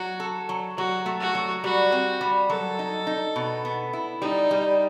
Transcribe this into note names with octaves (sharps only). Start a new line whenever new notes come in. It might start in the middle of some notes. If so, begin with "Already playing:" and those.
Already playing: F#3 F#4
A4
F#3
F#3 F#4
A3
F#4
F#3
G3 F#4
C4
G3
F#3 A4
D#4
D#4
B2
B3
E4
G3 D#4
G3